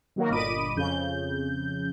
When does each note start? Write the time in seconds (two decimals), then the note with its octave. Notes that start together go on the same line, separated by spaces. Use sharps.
0.16 D#3 F#3 A#3 F#4 A#4
0.30 G1 A#2 D#5 B5 D6 D#7
0.76 F2 C#3 G6